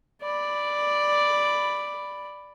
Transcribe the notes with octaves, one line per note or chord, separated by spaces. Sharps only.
D5 B5